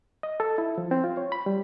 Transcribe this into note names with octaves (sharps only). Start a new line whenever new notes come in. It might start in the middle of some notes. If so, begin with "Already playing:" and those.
D#5
A4
E4
F3
C4
F4
C#5
B5
G3